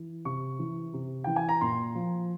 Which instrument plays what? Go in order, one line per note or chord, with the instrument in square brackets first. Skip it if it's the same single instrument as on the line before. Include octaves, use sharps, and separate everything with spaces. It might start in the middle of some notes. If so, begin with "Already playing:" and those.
Already playing: [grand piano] E3
C3 C#6
E3
C3
E3 G5
G#5
A#5
A#2 C6
F3